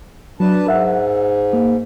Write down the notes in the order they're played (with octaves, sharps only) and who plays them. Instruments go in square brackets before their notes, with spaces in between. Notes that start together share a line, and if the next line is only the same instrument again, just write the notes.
[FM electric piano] F#3 [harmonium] D4 B4 A5
[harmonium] G#2 [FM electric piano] A#4 E5 F#5
[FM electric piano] A#3